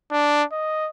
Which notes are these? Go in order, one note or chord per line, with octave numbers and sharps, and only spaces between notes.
D4
D#5